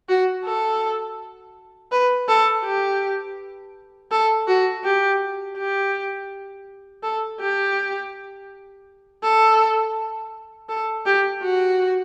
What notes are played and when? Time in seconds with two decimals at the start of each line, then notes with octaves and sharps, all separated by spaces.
0.09 F#4
0.45 A4
1.92 B4
2.28 A4
2.64 G4
4.11 A4
4.47 F#4
4.84 G4
5.57 G4
7.03 A4
7.40 G4
9.23 A4
10.69 A4
11.06 G4
11.42 F#4